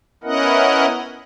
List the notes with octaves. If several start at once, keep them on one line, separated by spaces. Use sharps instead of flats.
B3 C#4 E4 A#4 D#5 F#5